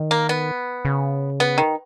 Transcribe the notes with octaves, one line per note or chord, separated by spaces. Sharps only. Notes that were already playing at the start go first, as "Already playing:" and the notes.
Already playing: D#3
A#3
B3
C#3
B3
D#3